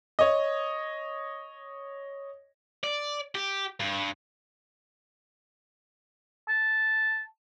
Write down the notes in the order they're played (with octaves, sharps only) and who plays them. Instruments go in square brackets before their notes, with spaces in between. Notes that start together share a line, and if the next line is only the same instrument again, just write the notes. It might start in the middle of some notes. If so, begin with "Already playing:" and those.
[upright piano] C#5 D#5
[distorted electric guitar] D5
G4
G2
[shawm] A5